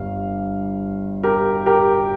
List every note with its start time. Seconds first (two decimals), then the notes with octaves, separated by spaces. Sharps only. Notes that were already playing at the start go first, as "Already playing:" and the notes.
Already playing: G1 G2 G3 F5
1.23 G4 A#4
1.66 G4 A#4